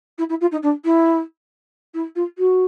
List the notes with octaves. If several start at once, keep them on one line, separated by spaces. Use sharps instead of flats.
E4
E4
F4
D#4
D4
E4
E4
F4
F#4